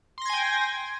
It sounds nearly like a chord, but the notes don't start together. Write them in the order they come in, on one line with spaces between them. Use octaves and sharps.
C6 A#6 G#6 G#5 G5